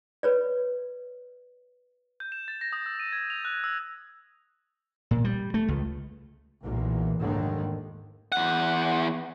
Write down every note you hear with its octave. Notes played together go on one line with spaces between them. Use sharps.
B4 C#5 D5
G6
E7
A6
A#6
D#6
E6
D#7
G#6
F7
F#6
E6
A#2
G3
A3
C#2
B1 E2 A#2
F1 D#2 G#2 D3 D#3
E2 F#5